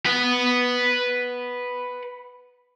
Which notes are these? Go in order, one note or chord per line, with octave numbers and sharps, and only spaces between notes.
B4 F#5